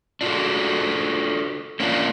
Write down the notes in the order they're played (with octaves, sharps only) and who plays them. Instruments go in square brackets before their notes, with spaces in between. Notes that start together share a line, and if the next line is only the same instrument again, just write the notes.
[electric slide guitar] D4 F4 F#4 A4
A#3 C#4 D4 F4